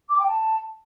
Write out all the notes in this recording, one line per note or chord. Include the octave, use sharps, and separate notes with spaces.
D6
G5
A5